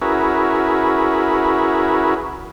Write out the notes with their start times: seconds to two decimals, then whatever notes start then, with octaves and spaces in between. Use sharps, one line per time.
0.02 C#4 E4 F#4 G#4 A#4 B4